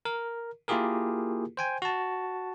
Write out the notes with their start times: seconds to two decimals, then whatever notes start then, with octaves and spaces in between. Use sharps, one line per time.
0.05 A#4
0.68 A#3 E4 F4 G4 G#4 A#4
1.57 C5 G5 G#5
1.82 F#4 A5